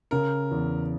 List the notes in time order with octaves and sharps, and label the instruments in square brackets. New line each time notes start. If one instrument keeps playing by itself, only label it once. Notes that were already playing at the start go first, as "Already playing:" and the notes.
[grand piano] C#3 [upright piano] A#4
[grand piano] E2